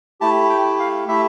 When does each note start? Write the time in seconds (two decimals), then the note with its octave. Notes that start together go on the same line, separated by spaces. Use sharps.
0.21 A3 E4 G4 A5
0.49 G5
0.79 F5
1.08 A3 E4 G4 E5